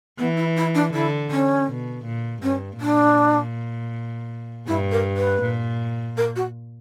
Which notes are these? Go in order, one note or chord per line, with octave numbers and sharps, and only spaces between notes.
E3 B3
E4
E4
D4
D3 E4
C#4
B2
A#2
G2 C#4
A#2 D4
G2 E4
A#4
B4
A#2
A#4
F#4